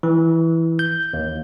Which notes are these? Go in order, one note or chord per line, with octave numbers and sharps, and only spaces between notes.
E3
G6
D#2